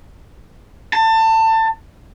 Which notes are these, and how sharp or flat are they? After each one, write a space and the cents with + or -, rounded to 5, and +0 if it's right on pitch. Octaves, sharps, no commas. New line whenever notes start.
A5 +25